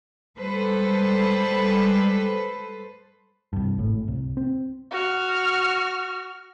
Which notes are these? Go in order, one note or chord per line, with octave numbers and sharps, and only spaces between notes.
G3 G#3 A4 B4 C5
C2 G2
G#1 A2
C2
C4
F#4 F6